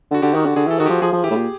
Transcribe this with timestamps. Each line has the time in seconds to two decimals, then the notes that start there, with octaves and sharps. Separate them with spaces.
0.11 D3
0.14 F#4
0.22 D3 G4
0.34 D#3 F#4
0.46 D3
0.56 D3 G#4
0.67 E3 A4
0.79 D#3 F#4
0.86 G4
0.90 F3
1.02 F3 G#4
1.13 F3
1.24 E3 G4
1.31 A2
1.36 A#2